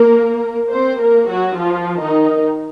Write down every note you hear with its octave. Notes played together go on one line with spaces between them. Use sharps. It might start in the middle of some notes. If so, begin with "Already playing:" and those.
Already playing: A#3 A#4
C4 C5
A#3 A#4
F#3 F#4
F3 F4
D#3 D#4